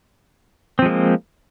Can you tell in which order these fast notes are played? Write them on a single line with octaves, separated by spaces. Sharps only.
C4 F3 G#3 A#3